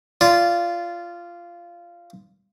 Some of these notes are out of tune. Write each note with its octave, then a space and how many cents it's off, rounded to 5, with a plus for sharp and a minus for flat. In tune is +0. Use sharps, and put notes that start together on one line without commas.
F4 -15 D5 -20